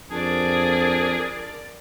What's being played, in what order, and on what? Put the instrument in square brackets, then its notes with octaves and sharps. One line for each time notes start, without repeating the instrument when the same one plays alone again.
[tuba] F2 [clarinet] D4 [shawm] G#4 [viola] A#4 D5